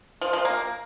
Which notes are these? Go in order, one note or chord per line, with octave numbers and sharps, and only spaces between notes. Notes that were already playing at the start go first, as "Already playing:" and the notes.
F3
F3
A#3